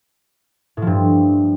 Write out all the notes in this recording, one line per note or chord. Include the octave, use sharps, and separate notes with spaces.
A2
F3
G2